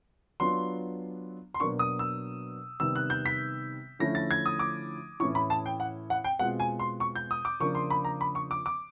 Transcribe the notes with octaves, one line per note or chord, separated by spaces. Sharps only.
F#3 B3 D4 F4 C6
C6
B2 F#3 A#3 D4 C#6
D#6
E6
C3 D#3 G3 B3 E6
F#6
G6
B6
D3 F3 A3 C#4 E4 A#6
A6
G#6
D#6
D6
A2 E3 A3 C#4 E4 C#6
B5
A5
G5
F#5
F#5
G5
B2 G#3 C4 F4 F#5
G#5
C6
C#6
G6
D#6
D6
C#3 F3 A#3 D4 F4 C#6
C6
B5
A#5
B5
C#6
D6
D6